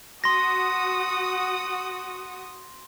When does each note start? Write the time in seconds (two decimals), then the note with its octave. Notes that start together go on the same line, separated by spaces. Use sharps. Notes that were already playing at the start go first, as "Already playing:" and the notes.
0.24 F#4 C6 D#6 A#6